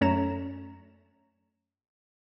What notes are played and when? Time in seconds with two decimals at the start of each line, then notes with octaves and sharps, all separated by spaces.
0.01 F#2 A3 C#4 C#5 A#5 E7